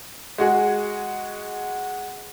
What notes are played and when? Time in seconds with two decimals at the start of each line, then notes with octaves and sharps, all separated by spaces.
0.38 G#3 F#4 G#4